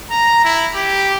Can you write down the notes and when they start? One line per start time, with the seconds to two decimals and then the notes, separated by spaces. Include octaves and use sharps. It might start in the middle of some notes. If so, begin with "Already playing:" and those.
0.11 A#5
0.44 E4
0.75 G4